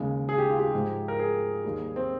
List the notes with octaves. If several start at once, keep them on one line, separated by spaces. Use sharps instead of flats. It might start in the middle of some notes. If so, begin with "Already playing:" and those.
Already playing: D#2 C#3 G#3
G#4
G4
F4
G4
G#2 F3 G#3
A#4
G#4
D#2 D#3 G3
C4